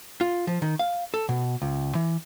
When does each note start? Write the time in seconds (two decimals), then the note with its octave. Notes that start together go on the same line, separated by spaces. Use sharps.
0.21 F4
0.47 F3
0.62 D#3
0.79 F5
1.14 A4
1.29 B2
1.62 C#2
1.95 E3